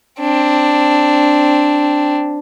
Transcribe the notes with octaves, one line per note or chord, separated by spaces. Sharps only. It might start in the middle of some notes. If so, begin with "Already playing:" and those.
C4 D4